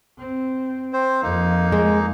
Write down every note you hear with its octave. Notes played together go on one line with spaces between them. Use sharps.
C4
C4 C5
F2 F3 A#3 D#4
G#3